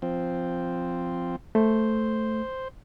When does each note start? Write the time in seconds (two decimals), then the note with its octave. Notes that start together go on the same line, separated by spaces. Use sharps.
0.02 F3 C4
1.55 A3 C5